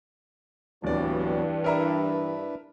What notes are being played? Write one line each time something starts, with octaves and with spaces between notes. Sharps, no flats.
D1 G2 E3 F#3 B3 F#4 D5
D4 E4 A#4 B4 E5 A#5